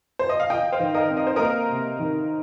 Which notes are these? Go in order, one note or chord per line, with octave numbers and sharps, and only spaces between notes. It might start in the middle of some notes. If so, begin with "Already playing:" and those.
C5
D#5
F5
F4 D#5 G5
C5 F5
D#3
A#4 D#5
C4
D#5
C5
A#3 A#4 D#5
C3
D#3